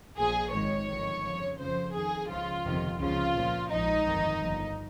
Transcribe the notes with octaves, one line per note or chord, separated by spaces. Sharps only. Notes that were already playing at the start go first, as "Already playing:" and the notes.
A#1 A#2 F3 G#4
G#1 G#2 D#3 C#5
G1 F2 D#3
F2 C#3 F3
F2 C#3 F3 C5
F2 D#3 G#4
C#2 C#3 F3 F4
G1 F2 C3 D#3
C#2 C#3 F3 F4
A#1 A#2 F3
A#1 G#2 F3 D#4
G1 F2 D#3
G1 G2 F3